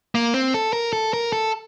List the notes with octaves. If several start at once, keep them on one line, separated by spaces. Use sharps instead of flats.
A#3
C4
A4
A#4
A4
A#4
A4